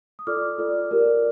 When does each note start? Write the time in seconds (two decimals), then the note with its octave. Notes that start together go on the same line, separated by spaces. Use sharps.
0.19 D#6
0.27 F4 A4 D5 D6 F6
0.58 F4 A4 D5
0.91 G4 A#4 D5